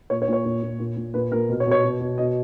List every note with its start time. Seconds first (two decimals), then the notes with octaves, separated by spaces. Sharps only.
0.10 A#2 C#5
0.22 C#5
0.28 A#2
0.33 C#5
0.45 A#2
0.62 A#2
0.79 A#2
0.96 A#2
1.14 A#2 B4
1.31 A#2 A#4
1.49 B2
1.60 C#5
1.66 B2
1.71 C#5
1.83 B2
2.00 B2
2.18 B2 D#5